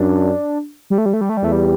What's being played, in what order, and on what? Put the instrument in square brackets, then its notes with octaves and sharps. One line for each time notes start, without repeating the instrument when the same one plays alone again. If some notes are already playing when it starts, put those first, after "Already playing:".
Already playing: [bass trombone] F#2 [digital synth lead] D4
[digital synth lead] G3
A3
G3
A3
G3
A3
G3
[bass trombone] E2 [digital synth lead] A3
[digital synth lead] G3